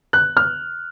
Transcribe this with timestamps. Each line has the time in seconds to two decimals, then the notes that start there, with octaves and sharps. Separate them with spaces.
0.13 F#6
0.37 F6